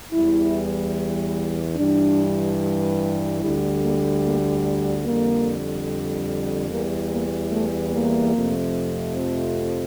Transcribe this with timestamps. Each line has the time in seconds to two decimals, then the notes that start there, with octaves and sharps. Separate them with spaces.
0.12 E2 E3 G3 E4
1.76 G2 E3 G3 D4
3.41 D2 D3 G3 E4
3.82 A#3
4.23 A#3
5.05 F2 D3 G3 A#3
6.70 E2 E3 G3 A#3
7.11 A#3
7.52 A3
7.93 A#3
8.34 F2 C3 F3 A3